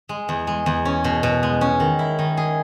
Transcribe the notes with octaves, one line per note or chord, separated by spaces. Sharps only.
G#3
E2
G#3
E2
C#4
B2
B2
G#3
C#4
D#3
E4
D#3
G#4